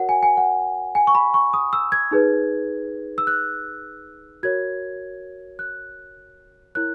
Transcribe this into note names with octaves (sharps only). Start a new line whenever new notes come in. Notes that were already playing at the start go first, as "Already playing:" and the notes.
Already playing: F#4 A#4 C#5 F#5
G#5
G#5
F#5
G#5
C#6
B5
C#6
D#6
E6
G#6
D#4 G#4 B4
E6
F#6
F#4 A#4 C#5 G#6
F#6
E4 A#4 C#5 F#6